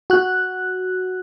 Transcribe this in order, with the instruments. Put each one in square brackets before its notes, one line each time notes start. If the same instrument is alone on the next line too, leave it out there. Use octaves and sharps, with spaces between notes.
[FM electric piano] F#4 F#6